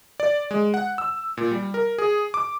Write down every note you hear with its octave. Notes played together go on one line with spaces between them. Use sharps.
D5
G#3
F#5
E6
A#2
G3
A#4
G#4
D6